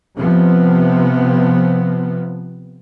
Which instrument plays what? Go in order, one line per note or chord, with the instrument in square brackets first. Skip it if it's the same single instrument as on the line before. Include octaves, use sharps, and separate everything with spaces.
[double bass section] C3 F3 B3